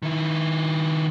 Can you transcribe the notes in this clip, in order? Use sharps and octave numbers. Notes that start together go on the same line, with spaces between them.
D#3 E4